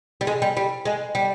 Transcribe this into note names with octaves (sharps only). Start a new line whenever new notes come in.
G3
G#3
G3
G3
G#3
G3